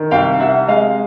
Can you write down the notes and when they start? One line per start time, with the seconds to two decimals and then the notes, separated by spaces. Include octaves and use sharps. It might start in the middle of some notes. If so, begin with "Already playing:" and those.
Already playing: D#3
0.11 C2 F5 G5
0.40 C3 E5 F#5
0.68 G#3 D#5 F5